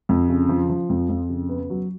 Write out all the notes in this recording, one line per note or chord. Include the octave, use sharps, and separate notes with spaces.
F2
C#3
F3
F3
F2
F2
C#3
B3
F#3